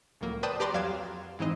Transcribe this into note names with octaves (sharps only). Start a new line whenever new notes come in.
C#2 A2 F#3 A#3
B4 C5 D5 G5 A5 D#6
G4 B4 D5 A#5 C6 D6
F2 F#3 F5 F#6 G#6 E7
G#2 E3 C4 D#4 D#5